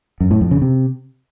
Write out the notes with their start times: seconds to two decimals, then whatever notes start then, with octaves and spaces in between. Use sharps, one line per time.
0.21 F#2
0.31 A2
0.41 F2
0.51 C#3
0.62 C3